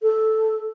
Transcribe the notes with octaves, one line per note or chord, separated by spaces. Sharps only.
A4